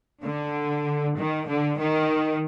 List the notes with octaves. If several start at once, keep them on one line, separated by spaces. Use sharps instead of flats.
D3
D#3
D3
D#3